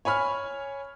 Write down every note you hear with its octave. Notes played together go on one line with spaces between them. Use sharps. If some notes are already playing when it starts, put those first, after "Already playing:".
C#5 G#5 B5 F6